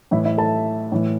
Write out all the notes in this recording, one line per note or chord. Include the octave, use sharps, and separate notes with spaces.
A2 E3 E4 E5
E4 E5
A4 A5
A2 E3